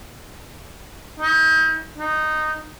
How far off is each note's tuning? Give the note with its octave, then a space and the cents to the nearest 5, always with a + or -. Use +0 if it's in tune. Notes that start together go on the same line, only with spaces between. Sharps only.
D#4 +40
D#4 -10